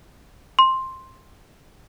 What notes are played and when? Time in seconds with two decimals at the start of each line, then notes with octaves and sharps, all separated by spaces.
0.59 C6